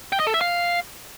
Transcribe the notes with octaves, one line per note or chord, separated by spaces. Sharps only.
G5
D#5
A4
E5
F5